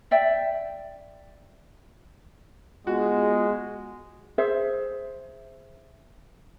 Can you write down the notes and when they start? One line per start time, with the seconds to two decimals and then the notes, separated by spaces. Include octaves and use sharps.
0.11 D5 E5 G5
2.87 G#3 B3 F4 F#4 G#4
4.38 G#4 C5 E5